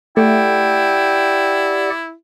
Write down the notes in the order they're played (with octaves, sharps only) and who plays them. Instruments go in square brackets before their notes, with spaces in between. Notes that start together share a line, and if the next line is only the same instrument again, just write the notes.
[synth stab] A3 [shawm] E4 [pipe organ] G4 D5 F#5 [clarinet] G5